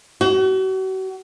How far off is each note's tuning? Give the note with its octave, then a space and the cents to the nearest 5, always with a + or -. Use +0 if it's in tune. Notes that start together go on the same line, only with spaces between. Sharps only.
F#4 +40